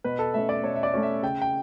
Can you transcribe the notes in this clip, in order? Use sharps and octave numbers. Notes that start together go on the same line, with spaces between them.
B2 B4
A4
A3 C#4 E5
D5
B2 C#5
E5
D5
A3 C#4
E5
C#3 G5
G5